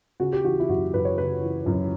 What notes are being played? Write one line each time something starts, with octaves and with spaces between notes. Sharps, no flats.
C#3 F#4
G4
E3 F#4
E4
F#2 F#4
F#2 B4
C#5
C#3 B4
E3
F#2